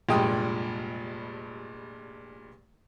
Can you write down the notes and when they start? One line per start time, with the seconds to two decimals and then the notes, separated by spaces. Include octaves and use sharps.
0.09 F1 G2 A#2 G#3 G5 D#6